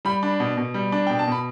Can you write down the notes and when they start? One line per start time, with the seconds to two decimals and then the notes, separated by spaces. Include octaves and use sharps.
0.05 G3 B5
0.23 D4
0.40 B2
0.57 B2
0.74 G3
0.92 D4
1.07 B2 G5
1.19 A5
1.27 B2 B5